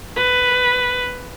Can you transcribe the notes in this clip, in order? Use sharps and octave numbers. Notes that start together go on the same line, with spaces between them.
B4